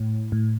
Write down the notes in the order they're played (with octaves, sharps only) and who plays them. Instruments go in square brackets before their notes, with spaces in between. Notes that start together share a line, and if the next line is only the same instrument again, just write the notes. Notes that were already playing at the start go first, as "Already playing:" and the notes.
Already playing: [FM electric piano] A2
A2